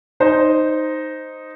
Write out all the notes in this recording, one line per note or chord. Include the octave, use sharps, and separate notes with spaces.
D#4 C5